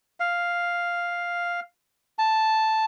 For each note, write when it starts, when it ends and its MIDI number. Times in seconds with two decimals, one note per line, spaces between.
0.20 1.60 77
2.19 2.85 81